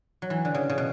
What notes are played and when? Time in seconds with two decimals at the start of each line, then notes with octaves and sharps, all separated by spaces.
0.22 F#3
0.30 E3
0.45 D3
0.54 C#3
0.70 C#3
0.78 B2